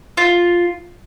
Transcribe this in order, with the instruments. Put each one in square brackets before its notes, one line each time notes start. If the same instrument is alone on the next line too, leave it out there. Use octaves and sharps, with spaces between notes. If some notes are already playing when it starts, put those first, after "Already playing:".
[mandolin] F4